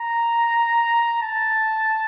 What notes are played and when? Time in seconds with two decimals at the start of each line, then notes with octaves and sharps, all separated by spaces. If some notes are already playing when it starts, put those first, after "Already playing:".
Already playing: A#5
1.22 A5